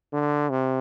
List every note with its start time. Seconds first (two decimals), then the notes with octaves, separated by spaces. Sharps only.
0.13 D3
0.50 C3